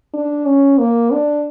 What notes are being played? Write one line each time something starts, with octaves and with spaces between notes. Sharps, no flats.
D4
C#4
A#3
D4